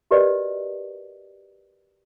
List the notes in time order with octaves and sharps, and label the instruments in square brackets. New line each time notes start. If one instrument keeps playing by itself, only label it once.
[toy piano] F#4 G4 A#4 B4 D5 D#5